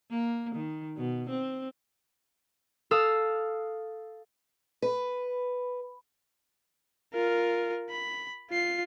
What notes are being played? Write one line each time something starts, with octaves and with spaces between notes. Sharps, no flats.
A#3
D#3
B2
C4
A4 F5 D#6 E6
B4
F4 A#4
B5
F4 C7